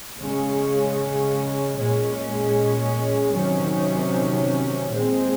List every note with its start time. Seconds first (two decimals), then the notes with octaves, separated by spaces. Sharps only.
0.20 C#3 G#3 C#4
1.77 A#2 G#3 C#4
3.32 C3 D#3 F#3 C#4
4.89 A#2 G#3 C4